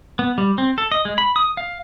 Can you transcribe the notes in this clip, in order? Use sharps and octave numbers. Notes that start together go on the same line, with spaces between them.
B3
G3
C4
A4
D#5
G#3
B5
D#6
F5